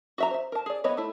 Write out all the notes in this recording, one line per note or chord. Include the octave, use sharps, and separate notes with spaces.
F#4 E5 A#5
C5 E5
A#4 A5
G#4 D5
B3 E4 C#5 D#5
A3 E4